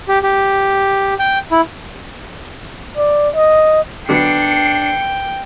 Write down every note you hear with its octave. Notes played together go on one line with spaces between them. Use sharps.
G4
G4
G5
E4
D5
D#5
D3 F#3 B3 D4 G5 C7 C#7